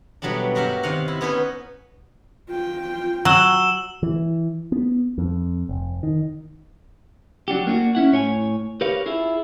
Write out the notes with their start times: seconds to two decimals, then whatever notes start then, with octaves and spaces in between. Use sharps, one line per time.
0.22 B2 F#3 G3 A3 D4
0.55 G2 F#4 G4 A#4 E5 F#5
0.83 C3 D#3 F5 F#5
1.08 E4
1.21 B3 C#4 D#4 E4 B4
2.49 F4 G5
3.25 F#3 E6 E7 G7
4.03 E3
4.72 B3
5.18 F2
5.69 F1
6.03 D#3
7.48 F#3 D4 F#4 G4
7.67 A#3 D4 D#4 F#4
7.95 C#4 E4 F#5
8.12 A2 C#5 G5 G#5
8.81 G4 A#4 B4 C#5 F5
9.06 E4 F4 G#4